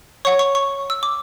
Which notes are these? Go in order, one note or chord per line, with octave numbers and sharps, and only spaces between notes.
C#5 F#5 C#6
C#6
C#6
E6
D6